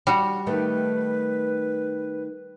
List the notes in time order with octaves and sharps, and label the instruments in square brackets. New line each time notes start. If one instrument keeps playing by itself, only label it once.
[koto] G3 F#4
[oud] D#3 A3 [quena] B4